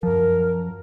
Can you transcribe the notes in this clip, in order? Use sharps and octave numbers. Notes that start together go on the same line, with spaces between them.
F#2 F3 A#4